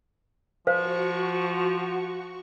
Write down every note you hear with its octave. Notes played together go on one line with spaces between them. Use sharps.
F3 F#4 C5 F5 C#6